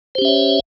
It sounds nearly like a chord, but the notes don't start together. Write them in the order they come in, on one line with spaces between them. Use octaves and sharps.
C5 G4 C#4 E5 C#5